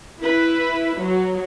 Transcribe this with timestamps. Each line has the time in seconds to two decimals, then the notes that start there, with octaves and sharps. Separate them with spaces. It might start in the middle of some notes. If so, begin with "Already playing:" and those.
0.20 E4 B4
0.98 F#3